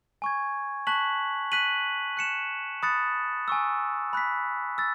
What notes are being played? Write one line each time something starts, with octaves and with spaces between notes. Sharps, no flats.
G#5 C#6 G#6
A5 C#6 F#6 B6 F#7
F#6 B6 D#7 F#7
F#6 C#7 E7
B5 D#6 F#6 A6 C#7
G#5 C#6 E6
B5 F#6 B6
E6 A6